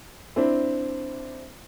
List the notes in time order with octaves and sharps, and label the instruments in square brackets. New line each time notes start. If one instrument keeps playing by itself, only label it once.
[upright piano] C4 D4 E4